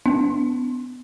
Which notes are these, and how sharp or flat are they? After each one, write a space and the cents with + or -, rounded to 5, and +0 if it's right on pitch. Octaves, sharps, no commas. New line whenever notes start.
B3 +25 D4 -30